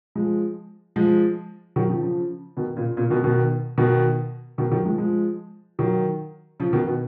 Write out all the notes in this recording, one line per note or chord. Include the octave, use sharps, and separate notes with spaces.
F3 G#3
F3 G#3
D#3 F#3
C#3 F3
C#3 F3
B2 D#3
A#2 C#3
A#2 C#3
B2 D#3
B2 D#3
B2 D#3
B2 D#3
D#3 F#3
F3 G#3
F3 G#3
D#3 F#3
C#3 F3
B2 D#3
B2